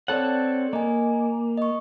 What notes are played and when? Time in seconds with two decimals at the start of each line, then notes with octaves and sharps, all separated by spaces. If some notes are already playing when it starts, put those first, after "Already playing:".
0.08 C4 A4 C#5 D5 F#5
0.73 A#3 D#5 G#5
1.58 D#5 C#6